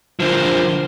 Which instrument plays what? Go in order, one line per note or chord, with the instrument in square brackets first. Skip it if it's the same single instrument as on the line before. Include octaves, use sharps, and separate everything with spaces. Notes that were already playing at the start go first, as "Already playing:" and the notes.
[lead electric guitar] D3 F3 [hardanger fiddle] A#4 C5